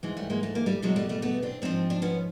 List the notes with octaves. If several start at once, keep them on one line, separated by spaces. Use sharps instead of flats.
G#2 E3 G#3
G3 A3
G#3 A#3
A3
A#3
G3 A3
E2 B2 F#3 G#3
G3 A3
G3 A3
A3 B3
C4 D4
G#2 F3 C4 D4
D4
B3 C#4